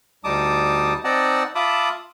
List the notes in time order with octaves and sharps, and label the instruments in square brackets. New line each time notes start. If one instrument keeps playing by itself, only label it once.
[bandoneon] D2 G3 D#4 A5 D6 D#6
C4 D#4 D5 D#5 F#5 A5
F4 E5 A5 B5 D6 D#6